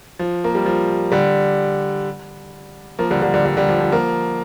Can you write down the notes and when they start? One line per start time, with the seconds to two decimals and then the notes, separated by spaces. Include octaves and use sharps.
0.19 F3
0.44 A#3
0.55 G3
0.66 F3
1.12 D3 G3
2.99 F3 A#3
3.10 D3 G3
3.22 D3 G3
3.34 D3 G3
3.45 D3 G3
3.57 D3 G3
3.69 F3
3.81 F3
3.92 F3 A#3